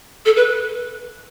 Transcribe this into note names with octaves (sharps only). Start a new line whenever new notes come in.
A4
B4